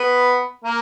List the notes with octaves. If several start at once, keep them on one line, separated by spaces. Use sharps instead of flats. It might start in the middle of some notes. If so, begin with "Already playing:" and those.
Already playing: B3 B4
A#3 A#4